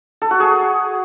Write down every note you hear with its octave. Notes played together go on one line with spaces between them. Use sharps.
A4
F#4
G#4